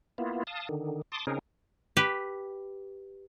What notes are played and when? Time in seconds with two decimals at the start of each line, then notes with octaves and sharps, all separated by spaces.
0.18 A#3 B3 E4 F4
0.47 F5 A5 D#6
0.69 D3 D#3
1.12 A5 C6 D6 D#6
1.27 C#3 C4 C#4 D#4 G#4 A#4
1.97 G4 B4